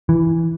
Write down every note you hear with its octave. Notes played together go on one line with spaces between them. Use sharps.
E3